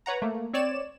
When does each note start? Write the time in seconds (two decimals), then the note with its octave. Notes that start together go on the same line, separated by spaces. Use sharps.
0.06 B4 C#5 F#5 A#5
0.22 A3 A#3
0.53 C4 C#5 D5 E7